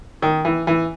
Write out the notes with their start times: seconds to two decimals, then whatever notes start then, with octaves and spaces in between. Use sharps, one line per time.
0.22 D#3
0.45 E3
0.67 E3